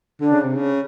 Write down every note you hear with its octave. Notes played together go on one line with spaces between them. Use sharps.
D3 D4
C#3
C3
C#3